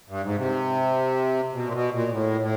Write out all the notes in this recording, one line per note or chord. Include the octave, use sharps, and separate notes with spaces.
G2
G#2
C3
B2
A#2
B2
A#2
A2
A2